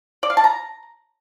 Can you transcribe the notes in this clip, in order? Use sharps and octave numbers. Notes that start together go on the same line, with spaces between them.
D5
F5
A5
A#5